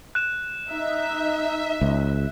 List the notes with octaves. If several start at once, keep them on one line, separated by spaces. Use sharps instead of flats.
F#6 E7
D#4 E5
C#2